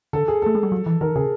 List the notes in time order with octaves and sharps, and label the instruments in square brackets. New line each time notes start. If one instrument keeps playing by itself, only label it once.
[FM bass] D3 [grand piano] A4
[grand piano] G#4
[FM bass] A3 [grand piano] A4
[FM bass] G#3
G3
F#3
E3
[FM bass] D#3 [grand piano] A#4
[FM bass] C#3 [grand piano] G#4